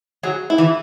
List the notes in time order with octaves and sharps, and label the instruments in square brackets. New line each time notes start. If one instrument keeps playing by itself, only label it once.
[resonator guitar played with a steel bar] F#3 [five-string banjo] G#4
[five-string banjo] E4
[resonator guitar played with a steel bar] E3